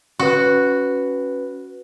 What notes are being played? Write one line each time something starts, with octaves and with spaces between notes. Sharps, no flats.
C#4 F#4 B4